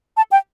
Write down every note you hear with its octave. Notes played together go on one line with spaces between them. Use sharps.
A5
G5